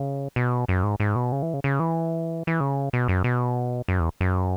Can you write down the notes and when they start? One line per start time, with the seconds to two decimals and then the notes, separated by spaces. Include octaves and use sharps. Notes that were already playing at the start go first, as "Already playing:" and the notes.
Already playing: C#3
0.36 B2
0.68 F#2
0.83 G#2
1.00 G#2
1.15 B2
1.32 C#3
1.42 E3
1.54 C#3
1.64 C#3
1.80 E3
2.47 E3
2.60 C#3
2.93 B2
3.08 F#2
3.24 B2
3.88 F#2
4.00 E2
4.21 F#2